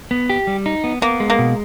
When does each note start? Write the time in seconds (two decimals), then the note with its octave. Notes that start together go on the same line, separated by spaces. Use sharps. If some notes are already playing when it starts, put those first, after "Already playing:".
0.11 B3
0.30 G4
0.47 G3
0.66 D#4
0.84 B3
1.02 A#3 B3
1.20 G#3
1.30 A#3
1.39 B2